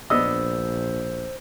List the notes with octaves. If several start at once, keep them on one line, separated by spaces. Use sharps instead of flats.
A#1 B3 D4 C5 D#5 E6